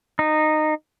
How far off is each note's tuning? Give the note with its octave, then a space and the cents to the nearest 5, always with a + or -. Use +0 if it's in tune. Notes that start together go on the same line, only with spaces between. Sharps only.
D#4 -15